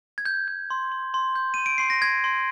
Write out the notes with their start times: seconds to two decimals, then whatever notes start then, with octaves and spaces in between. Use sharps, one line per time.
0.18 G#6
0.26 G6
0.48 G6
0.70 C6
0.92 C6
1.14 C6
1.36 G6
1.54 C6 D#7
1.66 D7
1.78 C6 C7
1.90 A#6
2.01 C6 G#6
2.24 C6